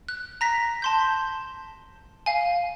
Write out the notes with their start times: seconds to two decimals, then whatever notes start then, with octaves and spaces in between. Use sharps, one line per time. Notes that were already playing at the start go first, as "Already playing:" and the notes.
0.09 F#6
0.41 A#5 A#6 B6
0.82 A5 C6 G6
2.26 F5 G#5